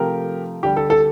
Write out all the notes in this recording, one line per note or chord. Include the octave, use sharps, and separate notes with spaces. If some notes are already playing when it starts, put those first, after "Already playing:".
Already playing: C3 F3 A3 G4 A#4
D3 G3 G4
A4
A4